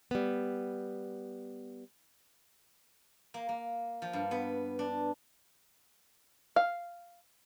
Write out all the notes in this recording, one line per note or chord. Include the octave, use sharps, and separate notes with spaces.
G3 B3
A#3
A#3
F3
G2
B3
D4
F5